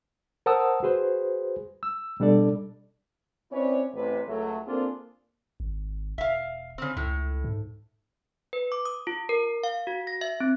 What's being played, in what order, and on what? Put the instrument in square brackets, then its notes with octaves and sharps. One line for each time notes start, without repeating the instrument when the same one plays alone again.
[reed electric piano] A#4 C5 F#5 A5 D#6 E6
F#4 G#4 B4 C5
E6
B2 G3 D4 A4 D5
[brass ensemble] C4 C#4 E4 B4 C#5 D5
A1 C3 B4
C#2 F#3 A3
A#3 C4 D4 F4 G#4 A4
[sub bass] G#1
[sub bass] E1 [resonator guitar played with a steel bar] E5 F5
[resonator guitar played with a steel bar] C#3 C4
[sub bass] C#2 [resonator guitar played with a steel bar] A2
[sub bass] G#2
[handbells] B4
D6
D#6
F4
A#4
F5
F#4
A#6
E5
C4